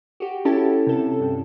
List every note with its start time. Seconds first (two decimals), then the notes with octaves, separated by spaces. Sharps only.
0.20 F#4 G4
0.45 C#4 E4 G4 A4 A5
0.87 C3 A4
1.20 G2 C3